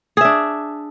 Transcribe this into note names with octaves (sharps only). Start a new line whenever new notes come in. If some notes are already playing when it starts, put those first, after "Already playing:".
D4 G#4 E5